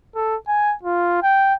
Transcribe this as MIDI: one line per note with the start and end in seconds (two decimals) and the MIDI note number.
0.16 0.36 69
0.48 0.75 80
0.83 1.21 65
1.23 1.54 79